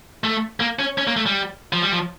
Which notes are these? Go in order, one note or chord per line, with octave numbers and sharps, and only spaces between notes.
A3
A#3
C#4
C#4
A#3
A3
G3
F3
G3
F3